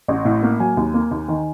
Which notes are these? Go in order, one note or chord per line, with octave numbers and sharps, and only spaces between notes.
A1
A2
A#3
F#3 G#5
D#2
A#3
D#2
D#3